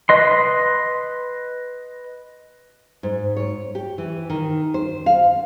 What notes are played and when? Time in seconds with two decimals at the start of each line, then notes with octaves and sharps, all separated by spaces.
0.09 B4 D#5 C6
3.03 G#2
3.36 C#5
3.75 G4
3.98 E3
4.30 D#3
4.74 C5
5.06 F5